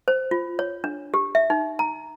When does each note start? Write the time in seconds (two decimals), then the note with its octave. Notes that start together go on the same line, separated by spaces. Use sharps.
0.08 C5
0.31 F4
0.59 C#5
0.84 D4
1.14 G4
1.35 E5
1.50 D#4
1.79 A#5